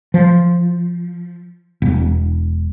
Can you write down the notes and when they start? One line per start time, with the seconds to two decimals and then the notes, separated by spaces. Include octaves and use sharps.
0.14 F3
1.82 E1